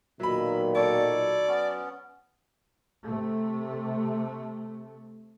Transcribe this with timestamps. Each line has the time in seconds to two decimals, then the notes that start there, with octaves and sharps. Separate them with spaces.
0.20 B1 A#2 D#3 F#3 E5 B5
0.75 A4 C#5 D5
1.48 B3 C#4
3.06 C3 A3